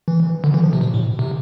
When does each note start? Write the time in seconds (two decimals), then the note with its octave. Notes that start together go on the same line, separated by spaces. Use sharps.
0.08 E3
0.44 D3
0.54 E3
0.64 F3
0.73 C3
0.81 B2
0.94 A2
1.19 C3